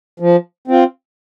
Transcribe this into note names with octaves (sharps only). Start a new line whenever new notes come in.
F3
C4 F4